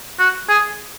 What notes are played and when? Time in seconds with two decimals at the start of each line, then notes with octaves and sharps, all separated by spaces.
0.19 F#4
0.49 G#4